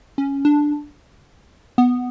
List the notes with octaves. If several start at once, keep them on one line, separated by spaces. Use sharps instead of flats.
C#4
D4
B3